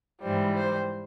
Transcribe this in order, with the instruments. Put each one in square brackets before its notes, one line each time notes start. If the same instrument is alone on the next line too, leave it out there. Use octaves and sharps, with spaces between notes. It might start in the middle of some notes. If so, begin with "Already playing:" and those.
[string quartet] G#2 E3 G3 C5
C5